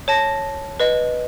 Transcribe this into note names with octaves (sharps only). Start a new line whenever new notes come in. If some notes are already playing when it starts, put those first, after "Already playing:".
C#5 A5 A#6
B4 D#5